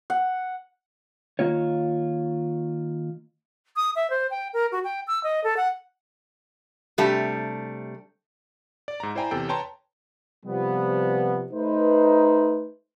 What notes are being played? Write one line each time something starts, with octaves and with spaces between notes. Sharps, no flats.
F#5
D#3 A#3 F4 C#5
D#6
E5
C5
G5
A#4
F#4
G5
E6
D#5
A4
F#5
C3 G3 A3 D4 G4
D5
G#2 A#5
E4 C5 D5 G5 G#5 A#5
E2 C3 A4 G5
B4 C#5 G5 A5 A#5 C6
C3 F3 G3 B3
A3 D#4 B4 C5